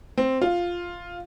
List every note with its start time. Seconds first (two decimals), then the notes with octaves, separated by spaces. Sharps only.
0.18 C4
0.42 F4